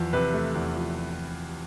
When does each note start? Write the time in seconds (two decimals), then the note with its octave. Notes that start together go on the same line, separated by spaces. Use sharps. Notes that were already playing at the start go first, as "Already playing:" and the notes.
Already playing: E2 F3
0.13 C3 B4
0.34 A3
0.55 E2
0.75 F3